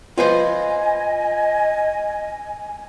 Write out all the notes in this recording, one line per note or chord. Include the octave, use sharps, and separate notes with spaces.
F4 B4 C5 D#5 G#5